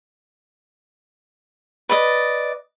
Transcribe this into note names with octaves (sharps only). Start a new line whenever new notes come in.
B4 D5 D#5